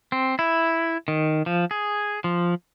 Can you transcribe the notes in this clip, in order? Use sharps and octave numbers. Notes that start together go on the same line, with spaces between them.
C4
E4
D#3
F3
G#4
F3